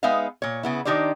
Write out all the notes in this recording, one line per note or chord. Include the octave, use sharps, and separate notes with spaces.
G#3 B3 D#4 B4 E5 F5
A#2 C#5
C#3 B3 E4
D#3 D4 D#4 G4 C5 D5